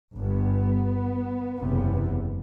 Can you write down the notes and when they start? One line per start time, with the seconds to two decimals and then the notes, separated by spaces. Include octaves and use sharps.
0.16 G1 G2 B3
1.58 F#1 E2 C3